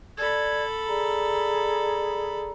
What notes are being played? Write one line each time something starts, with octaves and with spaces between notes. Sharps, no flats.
A4 D5 B5 G#6
G#4 D5 A#5